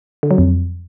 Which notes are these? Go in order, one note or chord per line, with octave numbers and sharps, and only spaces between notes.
D3
F#3
F2